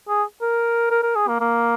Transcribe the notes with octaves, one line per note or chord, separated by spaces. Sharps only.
G#4
A#4
A#4
A#4
G#4
A#3
A#3